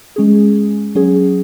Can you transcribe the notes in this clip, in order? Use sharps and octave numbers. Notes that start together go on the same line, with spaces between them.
G#3 C#4 G#4
F#3 C#4 G#4